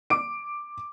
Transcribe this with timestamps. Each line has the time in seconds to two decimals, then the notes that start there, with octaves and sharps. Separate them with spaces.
0.10 D6 D7